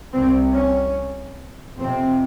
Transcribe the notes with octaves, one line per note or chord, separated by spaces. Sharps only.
C2 C3 C4
C#4
F2 C3 C4